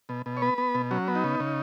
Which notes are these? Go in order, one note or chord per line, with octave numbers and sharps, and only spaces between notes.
B2
B2
C#5
B3 B4
B3
B2
F#3 C#4
B3
D#4
C#3
C#3